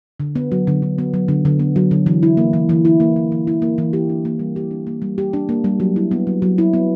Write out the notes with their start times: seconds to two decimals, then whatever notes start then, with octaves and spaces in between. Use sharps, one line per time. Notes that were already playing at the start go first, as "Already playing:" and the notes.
0.20 D3
0.35 B3
0.52 F#3
0.67 D3
0.82 D3
0.98 B3
1.14 F#3
1.28 D3
1.45 D3
1.59 B3
1.76 F#3
1.91 D3
2.06 E3
2.23 E4
2.37 A#3
2.53 E3
2.69 E3
2.85 E4
3.00 A#3
3.16 E3
3.32 E3
3.47 E4
3.62 A#3
3.78 E3
3.93 G4
4.10 D4
4.25 A#3
4.39 G3
4.56 G4
4.71 D4
4.87 A#3
5.02 G3
5.18 G4
5.33 D4
5.49 A#3
5.64 G3
5.80 F#3
5.96 E4
6.11 B3
6.27 F#3
6.42 F#3
6.58 E4
6.73 B3